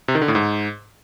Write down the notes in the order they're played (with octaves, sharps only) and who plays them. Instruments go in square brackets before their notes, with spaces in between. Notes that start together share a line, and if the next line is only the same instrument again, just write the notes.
[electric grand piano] C3
D#3
D3
A2
G#2